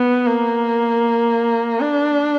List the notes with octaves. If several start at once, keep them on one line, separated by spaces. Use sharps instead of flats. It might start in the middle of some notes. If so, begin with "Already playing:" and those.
Already playing: B3
A#3
D4